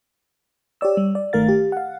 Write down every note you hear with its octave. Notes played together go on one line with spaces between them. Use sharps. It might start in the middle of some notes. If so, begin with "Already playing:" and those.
G4 C#5 D5 E6
G3
D5
G1 D#3 A3 A#4 F5 A6
G4
F5 F#5